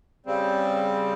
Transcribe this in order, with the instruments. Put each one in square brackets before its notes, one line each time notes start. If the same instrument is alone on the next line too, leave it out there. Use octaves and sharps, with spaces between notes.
[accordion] C#3 G3 C4